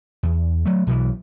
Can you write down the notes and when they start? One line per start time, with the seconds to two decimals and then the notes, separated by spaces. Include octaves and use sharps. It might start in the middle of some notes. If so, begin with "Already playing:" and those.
0.23 E2
0.65 F#3 A3
0.87 B1 B2 D3 E3